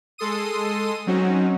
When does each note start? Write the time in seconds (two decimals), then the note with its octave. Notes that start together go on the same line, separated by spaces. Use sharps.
0.18 G#3 A4 C6 D#6 D#7
1.07 F#3 C4 C#4 D#4 F#4